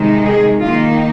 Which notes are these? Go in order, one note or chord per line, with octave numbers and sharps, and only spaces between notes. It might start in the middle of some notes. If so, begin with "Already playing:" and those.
Already playing: C3 D#3 G#3 D#4
G#4
D#3 A#3 D#4 F4